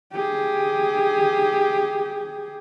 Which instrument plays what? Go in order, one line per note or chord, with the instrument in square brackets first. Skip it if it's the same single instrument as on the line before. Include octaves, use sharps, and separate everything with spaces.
[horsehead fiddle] G4 G#4